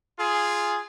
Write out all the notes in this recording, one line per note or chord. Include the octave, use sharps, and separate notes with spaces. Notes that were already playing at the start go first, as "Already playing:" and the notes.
F4 G#4